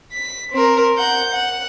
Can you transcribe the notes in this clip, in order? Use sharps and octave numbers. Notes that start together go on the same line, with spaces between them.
B6
C4 A#4
F#5 G6
F#5